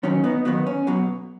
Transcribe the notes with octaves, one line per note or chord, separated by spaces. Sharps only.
D#2 D#3 F#3 C#4
B3 D#4
D#2 D#3 F#3 B3 D#4
C#4
B1 B2 F#3